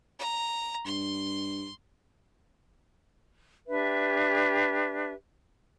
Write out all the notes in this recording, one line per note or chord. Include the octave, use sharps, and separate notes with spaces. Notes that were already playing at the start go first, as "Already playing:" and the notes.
A#5
G2 C6
D4 G4 B4 E5